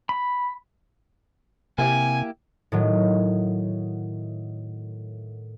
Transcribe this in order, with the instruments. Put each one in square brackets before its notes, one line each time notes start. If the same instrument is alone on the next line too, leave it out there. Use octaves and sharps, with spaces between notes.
[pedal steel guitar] B5
[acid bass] C3 [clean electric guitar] A#3 E4 G4 [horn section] G#5
[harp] A2 D#3 F#3